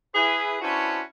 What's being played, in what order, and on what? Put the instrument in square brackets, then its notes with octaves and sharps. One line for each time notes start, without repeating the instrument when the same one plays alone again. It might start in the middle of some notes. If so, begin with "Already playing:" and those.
[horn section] E4 G#4 B4
C#4 D4 E4 F#4 B4 C5